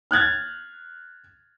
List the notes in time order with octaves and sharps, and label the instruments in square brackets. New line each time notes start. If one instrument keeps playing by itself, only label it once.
[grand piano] F6 F#6 G#6 A6